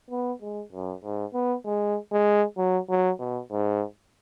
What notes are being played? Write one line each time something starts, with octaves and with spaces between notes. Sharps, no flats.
B3
G#3
F#2
G#2
B3
G#3
G#3
F#3
F#3
B2
G#2